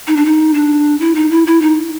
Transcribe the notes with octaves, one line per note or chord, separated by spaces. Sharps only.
D#4
D4
D#4
D4
E4
D#4
E4
E4
D#4